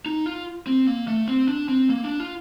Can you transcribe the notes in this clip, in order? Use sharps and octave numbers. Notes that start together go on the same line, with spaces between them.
D#4
F4
C4
A#3
A3
C4
D4
C4
A#3
D4
F4